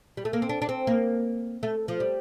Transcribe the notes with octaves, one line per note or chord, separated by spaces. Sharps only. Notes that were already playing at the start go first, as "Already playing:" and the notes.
G3
A3
A#3
C4
D4
D4
C4
A#3
A3
F3
G3